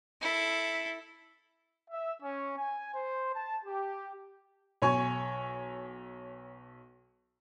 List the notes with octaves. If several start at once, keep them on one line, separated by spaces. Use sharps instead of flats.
E4 A4
E5
C#4
G#5
C5
A5
G4
B1 C#5 G#5 C#6